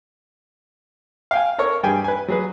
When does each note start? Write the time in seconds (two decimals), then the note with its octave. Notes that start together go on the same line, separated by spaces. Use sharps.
1.31 F5 G5 G#5
1.58 A4 A#4 C#5
1.83 G2 G4 G#4 G5 G#5
2.04 B4 G#5
2.28 F#3 G#4 B4